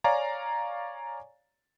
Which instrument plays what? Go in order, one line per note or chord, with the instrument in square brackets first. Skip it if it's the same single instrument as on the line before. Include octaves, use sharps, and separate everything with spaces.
[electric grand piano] C#5 D5 F5 G#5 A#5